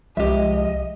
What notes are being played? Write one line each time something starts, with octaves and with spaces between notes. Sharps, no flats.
C2 F3 G#3 G4 D#5 E5